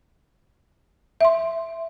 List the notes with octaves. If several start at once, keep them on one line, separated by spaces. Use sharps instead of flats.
E5 C6